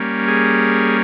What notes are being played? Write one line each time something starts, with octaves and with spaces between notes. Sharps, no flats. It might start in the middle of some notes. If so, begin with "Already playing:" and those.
Already playing: G3 A#3 C#4
G#4